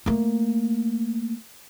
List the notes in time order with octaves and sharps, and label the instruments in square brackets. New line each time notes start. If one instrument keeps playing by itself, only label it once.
[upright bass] A3 A#3